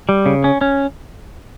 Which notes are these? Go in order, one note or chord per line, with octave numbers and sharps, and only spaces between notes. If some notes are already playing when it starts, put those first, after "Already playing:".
G3
C#3
C#4
C#4